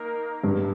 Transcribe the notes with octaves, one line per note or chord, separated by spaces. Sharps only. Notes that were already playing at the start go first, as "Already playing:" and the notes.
Already playing: A#3 D#4 A#4
G2 G#3